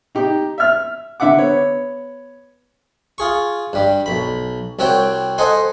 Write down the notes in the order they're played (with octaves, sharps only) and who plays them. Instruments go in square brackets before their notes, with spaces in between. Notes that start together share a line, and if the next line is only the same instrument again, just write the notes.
[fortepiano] D#4 G4
E5 F6
D3 E5 F#5 D6
B3 C#5
[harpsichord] F4 G#4 C#6
G2 G3
B1 B5
C2 C4 F#4 C#5 G5
A4 C5 D#5 F#5 G#5 C6